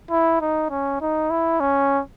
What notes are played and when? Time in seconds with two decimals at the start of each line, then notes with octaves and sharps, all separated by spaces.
0.11 E4
0.41 D#4
0.70 C#4
1.01 D#4
1.31 E4
1.60 C#4